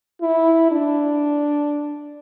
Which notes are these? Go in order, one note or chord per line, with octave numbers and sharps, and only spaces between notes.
E4
D4